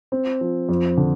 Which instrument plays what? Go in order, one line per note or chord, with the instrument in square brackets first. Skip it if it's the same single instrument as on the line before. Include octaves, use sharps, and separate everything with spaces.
[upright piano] C4
F3
F2
D3